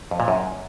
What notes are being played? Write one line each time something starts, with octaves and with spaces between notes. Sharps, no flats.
F2
A#2
F#2